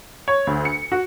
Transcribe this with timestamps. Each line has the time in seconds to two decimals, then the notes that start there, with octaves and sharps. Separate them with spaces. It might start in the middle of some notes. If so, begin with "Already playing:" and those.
0.28 C#5
0.47 D2
0.65 C#7
0.92 F#4